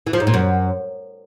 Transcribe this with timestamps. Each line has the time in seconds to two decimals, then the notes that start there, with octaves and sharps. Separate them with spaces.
0.07 E3
0.13 F3
0.20 G#2
0.27 A#2
0.34 F#2